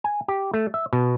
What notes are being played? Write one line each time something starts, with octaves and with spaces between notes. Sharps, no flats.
G#5
G4
A3
E5
B2